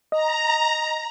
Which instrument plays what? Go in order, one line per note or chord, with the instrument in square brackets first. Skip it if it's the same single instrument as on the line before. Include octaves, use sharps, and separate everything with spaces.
[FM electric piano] D#5 [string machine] A#5